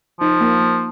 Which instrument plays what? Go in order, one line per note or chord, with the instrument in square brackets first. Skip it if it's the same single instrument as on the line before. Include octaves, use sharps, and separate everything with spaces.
[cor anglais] F3 [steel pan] D#4
[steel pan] A#3
A#3